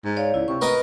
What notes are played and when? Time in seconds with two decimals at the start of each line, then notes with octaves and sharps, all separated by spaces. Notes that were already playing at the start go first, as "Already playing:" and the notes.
0.04 G#2
0.17 C#5 D5 F5
0.34 C#2 E4
0.48 C3 C#6
0.61 B3 A#4 D#5